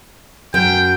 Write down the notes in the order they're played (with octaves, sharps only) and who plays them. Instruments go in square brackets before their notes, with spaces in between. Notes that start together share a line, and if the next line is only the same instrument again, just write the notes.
[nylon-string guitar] F#2 [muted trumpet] G5